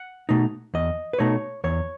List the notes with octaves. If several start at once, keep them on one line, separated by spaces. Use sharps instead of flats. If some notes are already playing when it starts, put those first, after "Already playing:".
Already playing: F#5
B2 A3 D#4
E2 D#5
B4
B2 A3 D#4 C#5
E2 C#5